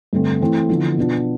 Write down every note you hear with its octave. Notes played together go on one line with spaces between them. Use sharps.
G2 D3 A3 C4
E3 A3 C4 E4
D3 F3 B3 E4
B2 B3 D4 F4